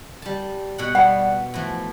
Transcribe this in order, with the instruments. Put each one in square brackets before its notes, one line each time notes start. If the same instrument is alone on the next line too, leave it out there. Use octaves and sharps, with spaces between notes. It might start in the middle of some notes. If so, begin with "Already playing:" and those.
[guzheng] G3 A5
B2 F#5
[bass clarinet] G3 [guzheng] B3 [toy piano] F#5
[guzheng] A2 E3 [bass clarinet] F3